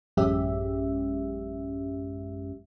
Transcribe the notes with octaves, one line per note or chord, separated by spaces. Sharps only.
A1 F#2 G#3 C#4 G4 E5